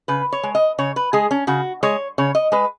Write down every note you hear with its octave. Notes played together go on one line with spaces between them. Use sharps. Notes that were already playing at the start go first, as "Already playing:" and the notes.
C#3 B4
C#5
G#3
D#5
C#3 C#5
B4
G#3 G#4
C#4
C#3 F#4
G#3 C#5
C#3 C#5
D#5
G#3 B4